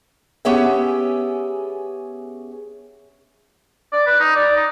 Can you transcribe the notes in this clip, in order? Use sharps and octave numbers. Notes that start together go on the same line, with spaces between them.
B3 C#4 G4 G#4 E5
D5
B4
D#4
D5
D#4